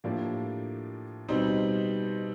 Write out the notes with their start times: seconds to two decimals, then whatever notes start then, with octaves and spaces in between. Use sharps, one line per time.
0.04 A2 F3 A#3 D4 G4
1.29 B2 G3 C4 D#4